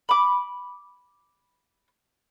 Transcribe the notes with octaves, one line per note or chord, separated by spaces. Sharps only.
B5 D6